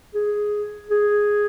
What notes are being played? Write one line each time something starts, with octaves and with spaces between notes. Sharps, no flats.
G#4
G#4